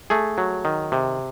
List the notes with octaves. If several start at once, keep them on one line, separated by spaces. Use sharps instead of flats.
A3 G#4
F#3
D#3
C3